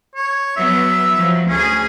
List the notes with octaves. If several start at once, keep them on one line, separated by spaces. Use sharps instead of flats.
C#5
F#3 B3 E5
F3 F#3
D2 C#4 G#4